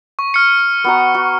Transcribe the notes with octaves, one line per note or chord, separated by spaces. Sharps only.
C#6
F6 C#7
B3 F#4 A#5
F#4